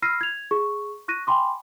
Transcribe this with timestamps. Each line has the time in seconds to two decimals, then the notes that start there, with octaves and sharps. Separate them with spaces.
0.02 B5 E6 F6 A#6 C7 D#7
0.21 G#6 F7
0.51 G#4 C#6
1.08 C#6 F#6 A#6 D#7
1.27 G5 G#5 B5 C6 D6